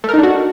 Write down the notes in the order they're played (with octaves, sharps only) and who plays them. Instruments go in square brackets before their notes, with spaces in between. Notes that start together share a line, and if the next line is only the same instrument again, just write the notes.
[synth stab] A3
A#4
D#4
D4
F#4